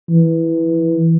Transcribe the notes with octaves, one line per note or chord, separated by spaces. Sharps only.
E3